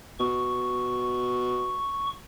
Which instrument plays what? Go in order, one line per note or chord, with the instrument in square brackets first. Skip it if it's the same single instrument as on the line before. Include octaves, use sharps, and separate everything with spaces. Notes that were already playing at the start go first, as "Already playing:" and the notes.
[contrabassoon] B2 [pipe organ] C#6